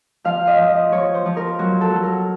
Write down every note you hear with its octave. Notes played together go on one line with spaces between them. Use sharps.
F3 F5
D#5
F3
D#5
F3 C#5
C5
F3
A#4
F#3 F#4
A4
F#3
A#4